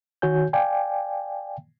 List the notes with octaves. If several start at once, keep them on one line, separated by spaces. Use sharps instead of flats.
D#3 F#4 C#5 G#5 G6
D5 F5 G5 G#5